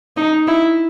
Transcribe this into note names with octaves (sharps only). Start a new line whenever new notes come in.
D#4
E4